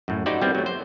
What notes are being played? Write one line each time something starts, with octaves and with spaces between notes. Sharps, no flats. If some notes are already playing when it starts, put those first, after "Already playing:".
F#2 A2
D#4 E4 F#4 G4 C5 D5
G3 B3 C4 E4
F#3 A3
C5